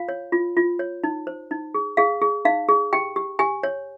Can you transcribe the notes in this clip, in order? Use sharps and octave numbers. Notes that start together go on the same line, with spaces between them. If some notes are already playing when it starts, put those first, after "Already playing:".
Already playing: F4 F5
C#5
F4
F4
C#5
D#4
C5
D#4
G#4
G#4 F5
G#4
D#4 F5
G#4
G4 G5
G4
G4 G#5
C#5